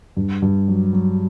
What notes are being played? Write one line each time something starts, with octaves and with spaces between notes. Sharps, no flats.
G2
G2
F#3
F#3